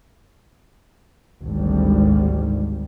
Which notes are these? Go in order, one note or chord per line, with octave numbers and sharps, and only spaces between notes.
G#1 D2 G3